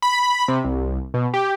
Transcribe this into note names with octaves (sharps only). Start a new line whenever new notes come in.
B5
C3
C2
B2
G4